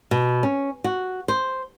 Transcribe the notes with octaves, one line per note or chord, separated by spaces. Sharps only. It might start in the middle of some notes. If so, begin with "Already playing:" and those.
B2
C#4
F#4
C5